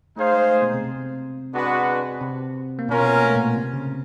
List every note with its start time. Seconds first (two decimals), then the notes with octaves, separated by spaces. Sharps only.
0.16 A3 D#4 G#4 C5 F5
0.33 G#3
0.51 A3
0.61 B2 B3
0.73 C3 C4
0.84 C3 C4
1.52 G#3 B3 D4 F#4 B4
2.21 C3 C4
2.79 A#3
2.88 B2 B3 C#4 F4 A#4
3.06 B3
3.16 A#3
3.25 A3
3.35 A#2 A#3
3.56 C3 C4
3.73 C#3 C#4